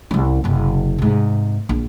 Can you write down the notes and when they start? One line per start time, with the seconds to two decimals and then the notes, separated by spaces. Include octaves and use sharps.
0.11 C2 C#4
0.44 F#1 C3
0.98 G#2 C3
1.69 A#1